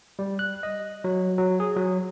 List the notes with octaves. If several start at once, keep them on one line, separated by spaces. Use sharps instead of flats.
G3
F#6
D#5
F#3
F#3
G#4
F#3